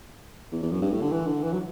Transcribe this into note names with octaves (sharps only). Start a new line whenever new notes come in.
E2
E2
F#2
G2
A2
D3
E3
D3
E3
F#3